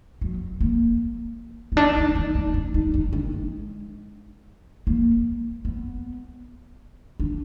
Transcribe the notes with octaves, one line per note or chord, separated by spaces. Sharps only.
F#3
A#3
B3
D4
D#4
D#4
D#4
D4
D#4
D#4
D4
G#3
A#3
B3
D4